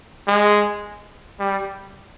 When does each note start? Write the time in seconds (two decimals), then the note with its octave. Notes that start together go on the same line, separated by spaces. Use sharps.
0.27 G#3
1.39 G3